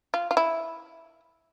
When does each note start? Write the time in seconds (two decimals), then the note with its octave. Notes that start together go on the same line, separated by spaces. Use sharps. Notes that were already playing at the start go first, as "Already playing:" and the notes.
0.14 F4
0.31 F4
0.37 E4